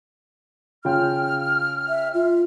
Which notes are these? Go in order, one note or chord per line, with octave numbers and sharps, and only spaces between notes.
C#3 F4 G5 F6
E5
F4